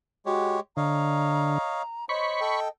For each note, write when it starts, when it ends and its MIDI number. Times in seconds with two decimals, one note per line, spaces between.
0.26 0.60 56
0.26 0.57 66
0.26 0.60 67
0.26 0.60 73
0.77 1.58 50
0.77 1.82 73
0.77 1.82 75
0.77 1.82 77
0.77 2.05 82
2.09 2.40 72
2.09 2.40 73
2.09 2.70 75
2.09 2.60 83
2.09 2.60 85
2.41 2.68 69
2.41 2.68 79